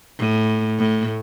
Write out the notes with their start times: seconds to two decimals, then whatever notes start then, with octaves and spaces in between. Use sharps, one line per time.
0.19 A2
0.79 A2